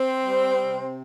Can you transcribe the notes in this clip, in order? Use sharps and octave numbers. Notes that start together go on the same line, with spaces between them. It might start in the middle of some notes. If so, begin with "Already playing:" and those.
Already playing: C4
G3
C3